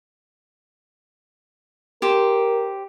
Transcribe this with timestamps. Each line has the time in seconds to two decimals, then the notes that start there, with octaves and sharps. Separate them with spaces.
2.02 G4 A#4 C5